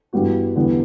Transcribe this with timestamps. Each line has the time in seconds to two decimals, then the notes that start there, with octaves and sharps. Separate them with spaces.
0.13 G2 E3 G3 B3 F#4
0.56 E2 D3 G3 B3